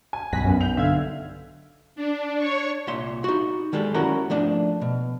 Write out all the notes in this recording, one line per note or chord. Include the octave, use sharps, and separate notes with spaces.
G#5
B1 G2 B2 F#6 A#6 B6
F#2 B3 B4
G6 F7
D3 E5 F5 G#6
D4
C#5 C#6
C2 A#2 E5 C6
D#4 F#4
D#3 G3 G#3 A4
C#4 E4 F#4 A#4 A#5
F3 A3 D4
B2